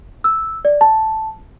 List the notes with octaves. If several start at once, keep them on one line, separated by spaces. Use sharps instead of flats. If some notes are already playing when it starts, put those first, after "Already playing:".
E6
D5
A5